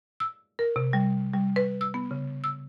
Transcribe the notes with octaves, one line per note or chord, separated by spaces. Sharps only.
E6
A#4
C3
G3
G3
B4
E6
B3
C#3
E6